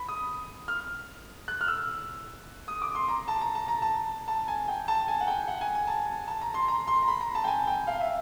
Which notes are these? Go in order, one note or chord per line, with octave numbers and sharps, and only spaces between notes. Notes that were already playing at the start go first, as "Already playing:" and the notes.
Already playing: B5
D#6
F6
F#6
F6
E6
D#6
D6
C6
A#5
A5
A#5
A5
A#5
A5
A5
G#5
G5
A5
G#5
F#5
G5
F#5
G#5
G#5
A5
A5
A#5
C6
A#5
C6
A#5
B5
A#5
A5
G5
G#5
G5
F5
E5